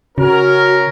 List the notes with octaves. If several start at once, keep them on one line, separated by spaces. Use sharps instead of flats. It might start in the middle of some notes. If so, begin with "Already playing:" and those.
C#3 C#4 F#4 A#4